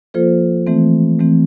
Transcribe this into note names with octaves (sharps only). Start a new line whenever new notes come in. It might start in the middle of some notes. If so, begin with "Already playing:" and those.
F3 A#3 F4 A4 C5
E3 A3 C4
E3 A3 C4